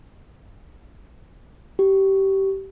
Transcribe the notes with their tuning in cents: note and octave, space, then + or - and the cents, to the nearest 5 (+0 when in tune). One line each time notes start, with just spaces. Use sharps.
G4 -20